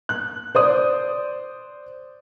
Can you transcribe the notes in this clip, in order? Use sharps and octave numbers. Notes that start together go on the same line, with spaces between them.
F#6
C5 D5 D#6